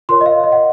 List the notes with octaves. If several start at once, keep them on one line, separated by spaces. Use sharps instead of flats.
F4 A#4 C#5 C6
D#5
F5
D#5
F#5